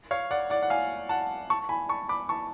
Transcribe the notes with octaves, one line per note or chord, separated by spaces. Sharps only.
C#5 F5
D5 F#5
D5 F#5
F#5
F5 G#5
F#5 A5
A5 C#6
G#5 B5
A5 C#6
B5 D6
A5 C#6